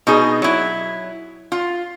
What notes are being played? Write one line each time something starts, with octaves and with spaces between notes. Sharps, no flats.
B2 D#4 G#4
F#3 E4
F4